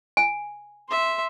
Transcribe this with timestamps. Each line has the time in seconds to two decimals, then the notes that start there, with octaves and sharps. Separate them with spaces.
0.17 G#5
0.89 E5 C6